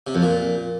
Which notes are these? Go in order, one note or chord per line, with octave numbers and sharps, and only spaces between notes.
C3
F2
A#2